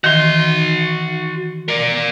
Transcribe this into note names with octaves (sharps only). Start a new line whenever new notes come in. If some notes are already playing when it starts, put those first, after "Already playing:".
D#3 E3 F#4 C6
A#4 D5